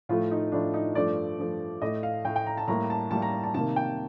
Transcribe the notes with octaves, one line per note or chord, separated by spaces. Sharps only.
A2 F3 A3 F4
D#4
A2 F3 A3 D4
D#4
G2 F3 A3 D5
G2 F3 A3
A2 A3 D#5
F5
A2 A3 G5
G5
A#5
A5
A2 G3 A#3 A#5
A5
A2 G3 A#3 A5
A#5
A5
C3 D#3 A#3 A5
G5